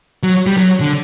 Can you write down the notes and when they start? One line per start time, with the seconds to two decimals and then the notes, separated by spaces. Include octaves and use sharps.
0.23 F#3
0.47 G3
0.57 F#3
0.81 D3